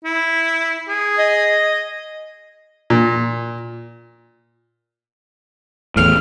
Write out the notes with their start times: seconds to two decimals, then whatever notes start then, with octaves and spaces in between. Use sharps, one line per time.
0.05 E4
0.89 G#4
1.18 D#5
2.90 A#2
5.96 E2 A2 F6